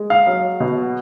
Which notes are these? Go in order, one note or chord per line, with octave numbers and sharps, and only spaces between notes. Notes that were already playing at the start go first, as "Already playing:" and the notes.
Already playing: G#3
F5
F#3
B2